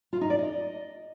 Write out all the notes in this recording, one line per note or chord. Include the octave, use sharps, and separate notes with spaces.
F4
D#4
D5
D#5